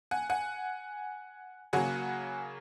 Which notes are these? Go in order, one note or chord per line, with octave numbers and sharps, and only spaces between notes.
F#5 G#5
F#5 G#5
C#3 F#3 A#3 F#5 G#5